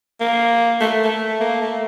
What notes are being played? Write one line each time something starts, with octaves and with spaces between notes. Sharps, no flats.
A#3
A3
A3
A#3
A3